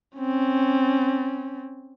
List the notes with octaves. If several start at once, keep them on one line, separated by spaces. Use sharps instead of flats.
C4 C#4